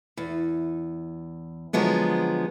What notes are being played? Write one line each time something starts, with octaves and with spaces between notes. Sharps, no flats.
E2
D3 F3 F#3 G#3 B3